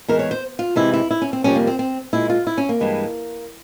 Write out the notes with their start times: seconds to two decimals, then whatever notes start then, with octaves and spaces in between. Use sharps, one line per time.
0.08 E2 E3 G#3 A#4
0.19 C#5
0.31 C5
0.59 F4
0.76 C3 E3 G#3 E4
0.94 E4
1.11 E4
1.22 C#4
1.33 C4
1.44 F2 C3 G3 A#3 C#4
1.55 A#3
1.67 C4
1.79 C4
2.13 A#2 G#3 E4
2.30 F4
2.47 E4
2.58 C#4
2.69 A#3
2.80 G2 E3 G#3